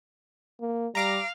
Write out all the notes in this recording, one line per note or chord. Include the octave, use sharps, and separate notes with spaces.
A#3
G3 F5 A#5 D6 A#6